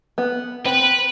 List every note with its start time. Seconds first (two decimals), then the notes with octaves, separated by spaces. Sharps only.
0.18 B3
0.65 C4 B4